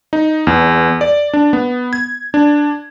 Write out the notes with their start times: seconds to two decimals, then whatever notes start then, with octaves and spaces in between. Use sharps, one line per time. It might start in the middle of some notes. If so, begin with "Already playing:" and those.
0.13 D#4
0.47 E2
1.01 D5
1.33 D4
1.53 B3
1.93 G#6
2.34 D4